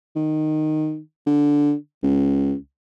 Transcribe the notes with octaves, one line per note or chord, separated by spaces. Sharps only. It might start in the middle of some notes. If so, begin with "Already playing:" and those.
D#3
D3
C#2